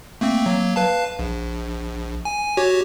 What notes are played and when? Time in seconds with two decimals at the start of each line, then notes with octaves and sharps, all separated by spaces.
0.21 A3 A#3 C4
0.46 F#3 A#3
0.76 B4 F5 A5
1.19 A#1
2.25 G#5
2.57 F#4 G4 C#5